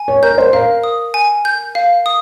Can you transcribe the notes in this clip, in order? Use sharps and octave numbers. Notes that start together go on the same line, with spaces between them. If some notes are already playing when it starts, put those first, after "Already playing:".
Already playing: G#5
C#5
A#4 G6
C5
A#4 F5
D#6
G#5
G6
F5
D#6